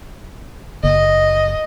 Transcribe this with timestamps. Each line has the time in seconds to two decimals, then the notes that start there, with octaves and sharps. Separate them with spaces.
0.84 F#1 D#5